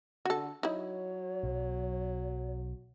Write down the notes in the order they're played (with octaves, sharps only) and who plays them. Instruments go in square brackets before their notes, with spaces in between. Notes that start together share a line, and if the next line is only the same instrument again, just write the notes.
[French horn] D3 [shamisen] F#4 A4
[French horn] F#3 [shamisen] D#4 E4 [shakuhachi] C#5
[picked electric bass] B1